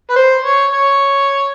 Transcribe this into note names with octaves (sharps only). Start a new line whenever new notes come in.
B4
C5
C#5
C#5